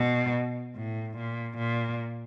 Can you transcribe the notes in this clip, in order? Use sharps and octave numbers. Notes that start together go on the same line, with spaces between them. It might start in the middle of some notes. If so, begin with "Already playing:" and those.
Already playing: B2
A2
A#2
A#2